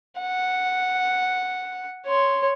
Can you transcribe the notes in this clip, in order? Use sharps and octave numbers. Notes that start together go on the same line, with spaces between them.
F#5
C#5 C6